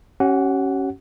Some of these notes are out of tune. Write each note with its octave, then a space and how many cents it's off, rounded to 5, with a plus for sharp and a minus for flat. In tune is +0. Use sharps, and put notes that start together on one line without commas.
C#4 -10 G4 -45 F#5 +0